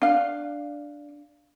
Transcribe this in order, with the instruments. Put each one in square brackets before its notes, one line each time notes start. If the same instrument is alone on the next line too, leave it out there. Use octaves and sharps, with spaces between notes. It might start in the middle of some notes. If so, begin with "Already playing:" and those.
[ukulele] D4 F5